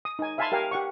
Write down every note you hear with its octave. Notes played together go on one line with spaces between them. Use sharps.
D#6
D#4 G#5
E5 F5 G#5 A5 B5 C6
G4 A#4 F5 G5 G#5
G4 F#5 C#6